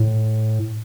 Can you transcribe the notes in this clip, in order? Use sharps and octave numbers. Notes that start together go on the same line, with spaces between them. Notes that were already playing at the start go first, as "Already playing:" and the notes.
Already playing: A2